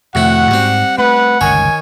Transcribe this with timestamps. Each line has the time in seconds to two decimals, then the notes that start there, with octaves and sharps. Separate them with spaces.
0.15 F2 A2 C3 D#3 E4 F#4 F#5
0.51 G#2 G3 C4
0.98 A3 B4 F#5
1.41 G1 C#2 D#3 C#5 G#5